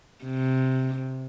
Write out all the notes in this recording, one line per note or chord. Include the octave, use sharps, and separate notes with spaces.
C3